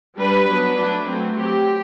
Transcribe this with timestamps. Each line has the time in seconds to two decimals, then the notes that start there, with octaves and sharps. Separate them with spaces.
0.18 G3 D4 B4
0.48 F#3 B3 D4
0.78 F#3 A3 D4
1.08 F#3 A3 C4
1.38 F#3 C4 G4